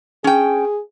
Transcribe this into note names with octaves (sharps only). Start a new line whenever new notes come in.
C#4 G#4 G5